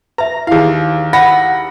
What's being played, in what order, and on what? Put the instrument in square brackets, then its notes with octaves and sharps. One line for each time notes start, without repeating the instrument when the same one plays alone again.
[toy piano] B4 E5 [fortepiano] A#5
[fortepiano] D#2 F5 [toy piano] E4 G#4
[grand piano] F#5 B5 A#6